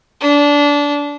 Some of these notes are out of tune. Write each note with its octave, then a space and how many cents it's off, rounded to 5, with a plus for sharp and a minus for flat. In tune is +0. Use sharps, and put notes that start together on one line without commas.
D4 -20